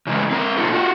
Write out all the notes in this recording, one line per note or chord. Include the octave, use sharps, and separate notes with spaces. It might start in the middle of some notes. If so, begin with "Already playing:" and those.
C#3 E3 G#3 A3
C4 A#4
A#2 C#3 D#4 F4 A4
F4 F#4